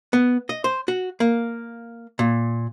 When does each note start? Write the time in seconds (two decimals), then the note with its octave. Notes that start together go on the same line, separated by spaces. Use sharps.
0.13 B3
0.49 D#5
0.64 C5
0.88 F#4
1.20 A#3
2.19 A#2